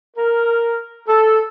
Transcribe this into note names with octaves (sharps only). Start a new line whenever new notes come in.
A#4
A4